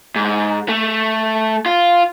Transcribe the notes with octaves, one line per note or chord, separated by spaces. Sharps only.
G#2
A3
F4